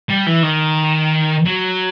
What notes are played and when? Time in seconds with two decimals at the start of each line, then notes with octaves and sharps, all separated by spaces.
0.09 G3
0.26 E3
0.43 D#3
1.46 F#3